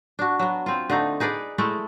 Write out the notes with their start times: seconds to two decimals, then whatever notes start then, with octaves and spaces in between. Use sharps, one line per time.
0.19 D4 F#4
0.40 F#3 B3
0.66 C4 F4
0.90 D3 A3 D#4
1.20 D#4 G#4 B4 D5
1.58 G#3 A3 E4 A4